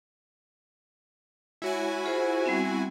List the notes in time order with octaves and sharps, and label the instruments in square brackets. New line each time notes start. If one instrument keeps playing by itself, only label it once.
[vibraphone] G#3 C#5 [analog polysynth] E4 F#4 G#5
[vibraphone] F4 G#4 C5
G3 B3 C4